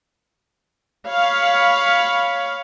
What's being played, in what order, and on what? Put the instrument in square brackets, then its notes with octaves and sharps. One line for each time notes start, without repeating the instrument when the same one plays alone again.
[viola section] C#5 F5 B5